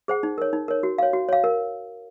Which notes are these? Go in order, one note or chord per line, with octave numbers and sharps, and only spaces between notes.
G#4 C5 F#5
D#4
A#4 C#5
D#4
A#4 C#5
F#4
C#5 F5
F#4
C#5 F5
A#4